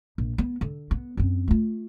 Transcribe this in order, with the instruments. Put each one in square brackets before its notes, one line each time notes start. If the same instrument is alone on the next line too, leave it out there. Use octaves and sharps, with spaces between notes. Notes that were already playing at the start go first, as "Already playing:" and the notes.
[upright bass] A#1
B3
D3
B3
F#2 C4
A3 F4